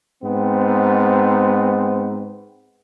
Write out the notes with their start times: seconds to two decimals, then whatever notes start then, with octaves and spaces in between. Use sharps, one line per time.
0.23 G#2 B3 C4